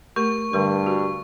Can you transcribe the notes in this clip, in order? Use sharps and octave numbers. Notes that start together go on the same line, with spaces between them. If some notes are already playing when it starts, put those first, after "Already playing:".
A3 G4 A#4 C#6
G2 D3 G3 A#4
F#4 G4